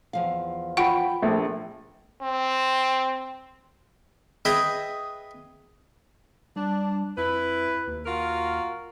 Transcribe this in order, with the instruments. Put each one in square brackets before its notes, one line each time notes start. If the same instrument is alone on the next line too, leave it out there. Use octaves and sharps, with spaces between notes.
[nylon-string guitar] E2 F3 F5
[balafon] F4 F#5 [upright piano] G5 B5
[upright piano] A#1 [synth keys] A3
[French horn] C4
[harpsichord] G#4 B4 D#5 E5 G5
[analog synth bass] G3 [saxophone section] D4
[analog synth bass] F2 [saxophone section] E4 B4
[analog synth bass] D#2
[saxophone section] F4 F#4 A#4